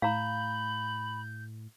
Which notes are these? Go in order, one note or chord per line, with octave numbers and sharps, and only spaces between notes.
A2 F5 A#5 B5 G6